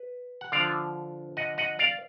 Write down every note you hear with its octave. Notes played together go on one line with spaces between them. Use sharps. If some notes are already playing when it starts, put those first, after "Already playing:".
Already playing: B4
F#5
D3 F3 D5 F5
D#5 F#5
D#5 F#5
D5 F5